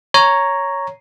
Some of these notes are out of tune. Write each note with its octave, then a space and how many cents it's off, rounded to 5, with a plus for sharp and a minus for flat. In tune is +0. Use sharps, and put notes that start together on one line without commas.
C#5 +0 A#5 +0